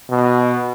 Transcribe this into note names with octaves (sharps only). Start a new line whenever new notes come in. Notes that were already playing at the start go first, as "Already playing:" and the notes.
B2